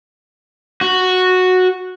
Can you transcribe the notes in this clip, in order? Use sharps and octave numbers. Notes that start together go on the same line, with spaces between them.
F#4